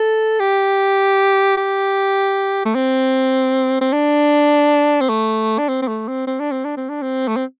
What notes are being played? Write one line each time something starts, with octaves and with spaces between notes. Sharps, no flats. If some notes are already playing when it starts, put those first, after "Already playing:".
Already playing: A4
G4
G4
A3
C4
C4
D4
C4
A3
D4
C4
C4
A3
C4
C4
D4
C4
D4
C4
D4
C4
A3
C4